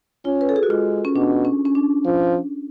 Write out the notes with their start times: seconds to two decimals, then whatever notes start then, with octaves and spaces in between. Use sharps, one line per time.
0.25 C#4 F4
0.41 B4
0.49 A4
0.56 G#4
0.63 F#4
0.70 G#3 F4
1.05 C#4
1.16 B2 D4
1.45 C#4
1.65 C#4
1.75 D4
2.05 F3